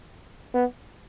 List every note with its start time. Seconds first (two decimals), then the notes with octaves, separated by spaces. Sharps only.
0.54 B3